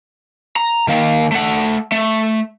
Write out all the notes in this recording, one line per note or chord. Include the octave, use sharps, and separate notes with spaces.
A#5
D#3 A#3
A3 F#5
A3